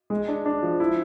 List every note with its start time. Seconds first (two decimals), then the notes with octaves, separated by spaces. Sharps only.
0.10 G#3
0.28 D4
0.45 D4
0.63 F3
0.80 E4